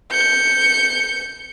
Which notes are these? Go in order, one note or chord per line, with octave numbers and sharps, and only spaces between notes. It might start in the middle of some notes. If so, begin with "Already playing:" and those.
G6 C#7